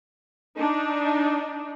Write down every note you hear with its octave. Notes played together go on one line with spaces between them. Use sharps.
D4 D#4